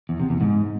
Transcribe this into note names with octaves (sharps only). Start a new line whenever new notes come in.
E2
C3
E2
G#2